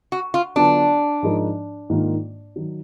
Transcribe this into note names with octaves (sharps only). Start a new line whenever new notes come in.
F#4
F4
D3 F#3 B3 D4 F4 B4
G#2 F3 G#3 D#4 A#4
G#2 D#3 A#3 D4 F4
D#3 F#3